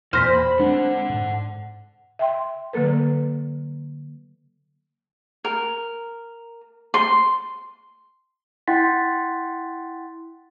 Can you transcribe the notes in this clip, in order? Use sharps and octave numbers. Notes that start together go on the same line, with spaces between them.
E2 A#2 C5 F6 A#6 B6
B5
G#3 C4 D4 D5 F#5
G#2
E5 G5 C6
D3 F#3 A#3 A4 B4
A#4
C6
E4 F#5 G5 C6 A6 B6